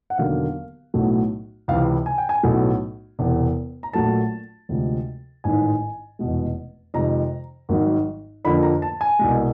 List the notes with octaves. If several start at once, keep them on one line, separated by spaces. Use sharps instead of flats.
F#5
E1 D#2 D3 F#3 A#3 F5
B1 A2 F#3 A3
C#2 C3 E3 F5
G#5
G5
G#5
B1 A2 F#3 A3
E1 E2 C3
A#5
A#1 A#2 F#3 A3 A5
D2 C3 F3 G#3
A1 G#2 D#3 G#5
F1 E2 B2 G#3
F2 C3 D#3 G#3 A#5
G#1 G#2 D#3 F#3
F2 D3 F3 A#3 B5
A#5
A5
G#5
C2 B2 G#3